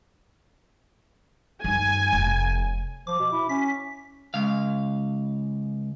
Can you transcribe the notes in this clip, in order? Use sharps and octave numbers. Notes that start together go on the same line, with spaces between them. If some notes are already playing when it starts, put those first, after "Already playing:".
G2 D#3 G#5
F1
F3 D6
B2
E4
C#4 B6
C#2 F5